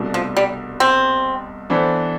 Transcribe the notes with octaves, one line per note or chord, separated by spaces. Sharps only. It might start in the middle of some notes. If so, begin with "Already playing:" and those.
Already playing: C2 B2 A3 D4
F3
G3
C4
E3 B3 D4 A4 C5